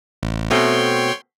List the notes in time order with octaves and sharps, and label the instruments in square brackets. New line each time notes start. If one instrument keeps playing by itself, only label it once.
[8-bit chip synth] A1
[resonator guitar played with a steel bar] B2 A3 C4 [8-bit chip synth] C#5 G5 C6